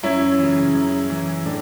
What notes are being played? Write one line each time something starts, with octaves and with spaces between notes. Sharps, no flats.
F#2 C#4 E4
C#3 E3
F#2
E3
A2 D4